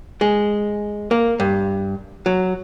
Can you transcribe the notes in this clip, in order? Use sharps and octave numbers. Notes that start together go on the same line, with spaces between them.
G#3
A#3
G2
F#3